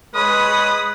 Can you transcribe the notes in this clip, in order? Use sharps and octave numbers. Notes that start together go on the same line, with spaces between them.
G#3 B4 C#5 B5 D#6